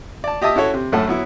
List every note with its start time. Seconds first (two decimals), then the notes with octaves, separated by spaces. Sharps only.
0.24 D5 A5
0.42 G4 D#5 E5 A5 D#6
0.55 C#4 E4 F#4 A4 C#5
0.74 C3
0.92 F#2 A2 A3 F#5 A5
1.08 F#3 B3 E4